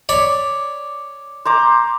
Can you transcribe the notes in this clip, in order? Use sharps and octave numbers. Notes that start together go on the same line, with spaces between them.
C#5 D5 B5
C5 A#5 D6